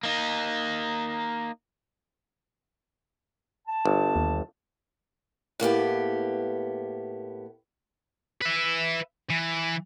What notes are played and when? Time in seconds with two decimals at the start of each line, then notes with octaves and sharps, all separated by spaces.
0.03 A#3 D#4
3.67 A5
3.85 G1
4.16 D#2
5.60 A2 A#3 B3 G4
8.42 B4 E5
9.30 E3